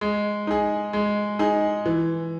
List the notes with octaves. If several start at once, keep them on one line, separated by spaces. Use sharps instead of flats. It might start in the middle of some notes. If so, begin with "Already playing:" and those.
G#3
D#4 G#4
G#3
D#4 G#4
E3